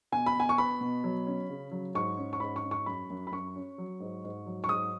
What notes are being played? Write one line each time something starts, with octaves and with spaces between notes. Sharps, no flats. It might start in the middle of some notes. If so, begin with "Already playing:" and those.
B2 G#5
B5
B2 G#5
C#6
B3 B5
B2
F#3
C#4
C#3
F#3
G#2 C#6
C#4
C#6
G#2 B5
C#6
C#4
C#6
F#2 B5
F#2
B5
F#2 C#6
C#4
F#3
G#2
G#2
F#3
C#6
G#2 D#6